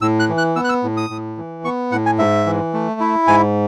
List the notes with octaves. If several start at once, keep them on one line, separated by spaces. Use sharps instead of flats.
A2 E6
F#6
E3
F#6
B3 E6
F#6
E6
A2
D#6
A2
E3
B3 C#6
A2 F#5
G#5
G#2 E5
E3
A3
E4
G#2 G#5